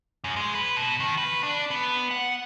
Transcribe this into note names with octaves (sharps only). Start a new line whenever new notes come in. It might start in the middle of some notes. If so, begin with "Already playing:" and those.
F#2
G#3
B4
B2
D#3
B4
D4
B3
F#5